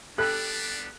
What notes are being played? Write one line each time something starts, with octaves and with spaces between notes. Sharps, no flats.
G3 B3 D4 G4 A4 B5 F#6